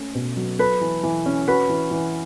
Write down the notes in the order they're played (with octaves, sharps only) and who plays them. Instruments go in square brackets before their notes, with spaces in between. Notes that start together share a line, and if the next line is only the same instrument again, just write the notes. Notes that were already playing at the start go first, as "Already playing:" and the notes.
Already playing: [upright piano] A3 C#4
B2
F#3
[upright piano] A4 [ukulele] B4
[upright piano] E3
E3
C#4
[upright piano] F#4 [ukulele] B4
[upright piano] E3
E3